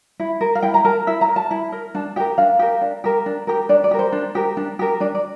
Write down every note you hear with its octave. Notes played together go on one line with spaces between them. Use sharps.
E4
A#4
F5
E4 G5
A#5
A#4 A5
E4 E5
A#5
A#4
A5
E4
A#4
D4 A5
G4 A#4 G5
D4 F5
G4 A#4
D4
G4 A#4
D4
G4 A#4
D4 D5
D5
G4 A#4
C5
D4
G4 A#4
D4
G4 A#4
D4 D5
D5